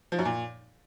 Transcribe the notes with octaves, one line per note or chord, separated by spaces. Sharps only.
F3
F#2
A#2